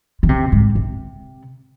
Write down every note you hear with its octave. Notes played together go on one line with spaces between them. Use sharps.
D#3
C3
G#2
C3